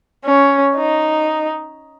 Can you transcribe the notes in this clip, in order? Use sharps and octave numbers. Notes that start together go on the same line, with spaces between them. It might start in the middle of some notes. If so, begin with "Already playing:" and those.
C#4
D#4